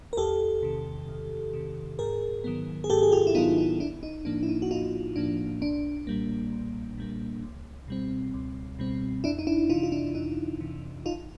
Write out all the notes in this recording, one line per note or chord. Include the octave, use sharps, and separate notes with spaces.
A#4
E2 G4 A4
C3 D#3
E2
C3 D#3
G#2 G#4 A#4
D#3 F#3 B3
G#4
G#2 G4 A4
G#4
F4 G4
E4
D#3 F#3 B3 D#4 F4
D#4
A#1 D4 E4
D#4
A2 F3 A#3 D4
E4
D#4
F#4
A#1 D#4 F4
A2 F3 A#3 D4
B1 D4
A#2 G3 A#3
B1
A#2 G3 A#3
C#2
B2 G3 C4
C#2
B2 G3 C4
F2 D4 E4
D#4
D4 E4
C3 E3 D#4 F4
F4
D4 E4
F2 D#4
C3 E3
G#1 D#4 F4